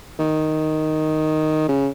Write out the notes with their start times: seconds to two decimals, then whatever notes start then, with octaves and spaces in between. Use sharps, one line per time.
0.19 D#3
1.69 C#3